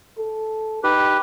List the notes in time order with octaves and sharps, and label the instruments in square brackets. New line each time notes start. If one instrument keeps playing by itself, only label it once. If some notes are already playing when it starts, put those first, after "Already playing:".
[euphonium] A4
[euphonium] D#4 [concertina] G4 B4